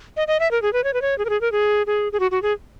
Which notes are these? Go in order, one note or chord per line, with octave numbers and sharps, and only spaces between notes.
D#5
D#5
E5
A#4
G#4
B4
C#5
B4
C#5
G#4
A#4
G#4
A#4
G#4
G#4
G#4
F#4
F#4
G#4